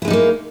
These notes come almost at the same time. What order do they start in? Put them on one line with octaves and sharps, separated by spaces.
E4 G#3 D#4 G3 A#3